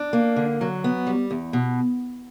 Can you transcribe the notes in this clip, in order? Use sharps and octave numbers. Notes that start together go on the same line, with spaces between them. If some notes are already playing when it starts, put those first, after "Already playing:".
Already playing: D4
A#3
D3
F#3
B3
G3
E2
B2